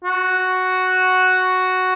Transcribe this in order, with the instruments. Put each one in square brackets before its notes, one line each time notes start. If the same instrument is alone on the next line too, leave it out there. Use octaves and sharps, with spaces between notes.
[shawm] F#4